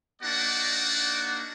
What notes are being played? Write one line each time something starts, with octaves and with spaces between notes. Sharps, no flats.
A#3 D4 D#4 F#4 D5 F#5